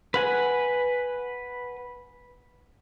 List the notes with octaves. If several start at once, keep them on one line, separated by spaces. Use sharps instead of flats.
B4 F#5 G#5